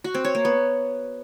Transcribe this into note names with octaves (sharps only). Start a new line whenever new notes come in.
F#4
C4
C#5
A#3
B3